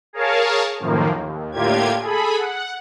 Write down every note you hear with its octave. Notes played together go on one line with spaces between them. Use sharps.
G#4 A#4 C#5 F5 A5
F#2 A2 D#3 F3 A#3
D#2
A2 D3 A#3 F4 G4 G#6
G#4 A4 B5
F#5